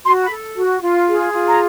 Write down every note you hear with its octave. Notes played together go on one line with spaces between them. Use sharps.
F#4 C6
B5
A4
F#4
F4
G#4
F4
A#5